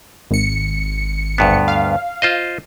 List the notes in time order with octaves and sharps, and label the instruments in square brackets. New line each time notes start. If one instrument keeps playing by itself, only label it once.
[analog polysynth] G#1 C#7
[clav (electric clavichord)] D2 G2 B3
[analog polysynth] F5
[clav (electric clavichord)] F4 C5 D#5